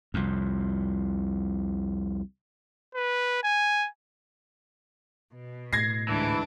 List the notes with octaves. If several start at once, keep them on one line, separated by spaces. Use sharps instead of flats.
C2 F2
B4
G#5
B2
A2 G#6 A#6 C7
D2 G#2 E3 D4